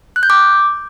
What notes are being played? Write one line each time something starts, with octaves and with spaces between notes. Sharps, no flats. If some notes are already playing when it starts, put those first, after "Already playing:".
F#6
G6
D6